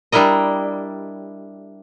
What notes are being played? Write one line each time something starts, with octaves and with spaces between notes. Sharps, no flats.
G3 D4 E4 A#4 D#5